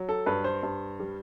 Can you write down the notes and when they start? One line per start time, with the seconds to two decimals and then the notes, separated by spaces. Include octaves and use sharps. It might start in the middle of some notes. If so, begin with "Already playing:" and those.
Already playing: F#3
0.09 A4
0.26 G2 B4
0.44 C5
0.63 G2
1.00 G3